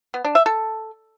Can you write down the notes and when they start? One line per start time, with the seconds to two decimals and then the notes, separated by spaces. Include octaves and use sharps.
0.14 B3
0.25 D4
0.35 E5
0.46 A4